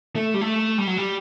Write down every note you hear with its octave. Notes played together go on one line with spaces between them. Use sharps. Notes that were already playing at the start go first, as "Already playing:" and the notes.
A3
G3
A3
G3
F#3
G3